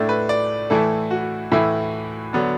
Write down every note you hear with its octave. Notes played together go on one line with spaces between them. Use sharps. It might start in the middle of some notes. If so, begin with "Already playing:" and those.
Already playing: A2 A3 D4
B4
D5
A2 E3 A3 E4 A4
F#4
A2 E3 A3 E4
D3 F#3 B3 D4